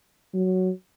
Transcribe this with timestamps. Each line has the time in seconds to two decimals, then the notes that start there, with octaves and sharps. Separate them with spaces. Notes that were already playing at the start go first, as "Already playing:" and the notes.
0.34 F#3